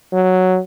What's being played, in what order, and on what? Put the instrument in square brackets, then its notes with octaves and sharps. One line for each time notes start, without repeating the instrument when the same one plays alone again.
[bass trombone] F#3